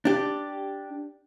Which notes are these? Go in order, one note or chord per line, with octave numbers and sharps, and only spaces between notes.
D4 G4